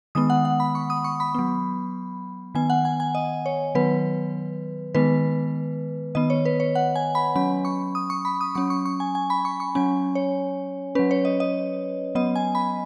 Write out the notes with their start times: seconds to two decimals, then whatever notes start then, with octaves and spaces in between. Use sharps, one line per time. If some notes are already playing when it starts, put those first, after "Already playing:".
0.15 D#3 G#3 B3 D#6
0.30 F#5
0.45 F#5
0.60 B5
0.75 C#6
0.90 D#6
1.04 C#6
1.20 B5
1.35 F#3 B3
2.55 D#3 B3 G#5
2.70 F#5
2.85 G#5
3.00 G#5
3.15 D#5
3.46 C#5
3.75 D#3 F#3 B3 B4
4.95 D#3 G#3 B3 B4
6.15 D#3 B3 D#5
6.30 C#5
6.45 B4
6.60 C#5
6.75 F#5
6.96 G#5
7.15 B5
7.35 F#3 C#4 B5
7.65 C#6
7.95 D#6
8.10 C#6
8.25 B5
8.41 D#6
8.55 F#3 C#4 C#6
8.70 C#6
8.85 C#6
9.00 G#5
9.15 G#5
9.30 B5
9.45 C#6
9.60 C#6
9.75 F#3 C#4 G#5
10.15 C#5
10.95 F#3 C#4 B4
11.11 C#5
11.25 D#5
11.40 D#5
12.15 F#3 B3 D#5
12.36 G#5
12.55 B5